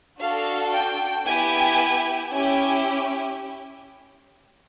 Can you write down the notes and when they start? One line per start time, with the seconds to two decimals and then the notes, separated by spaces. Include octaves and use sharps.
0.19 D4 F#4 A4 F5
0.73 G5
1.25 B3 E4 G4 G#5
2.32 C#4 E4 G4 G#5